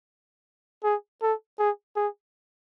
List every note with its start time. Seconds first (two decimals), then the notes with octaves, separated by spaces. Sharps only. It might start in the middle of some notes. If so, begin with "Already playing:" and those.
0.84 G#4
1.22 A4
1.59 G#4
1.96 G#4